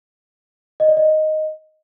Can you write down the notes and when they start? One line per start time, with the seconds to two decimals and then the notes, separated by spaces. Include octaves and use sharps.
0.80 D#5
0.88 D5
0.97 D#5